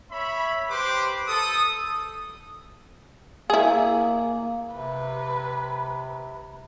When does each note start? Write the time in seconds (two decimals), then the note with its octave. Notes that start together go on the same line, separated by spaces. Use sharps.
0.12 C#5 E5 B5
0.70 G4 B4 C5 C6 D6
1.28 A4 D#6
3.50 A#3 E4 G#4
4.75 C3 B4